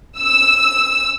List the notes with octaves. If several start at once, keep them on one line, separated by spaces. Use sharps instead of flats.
E6